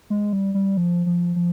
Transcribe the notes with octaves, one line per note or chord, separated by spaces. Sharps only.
G#3
G3
G3
F3
F3
F3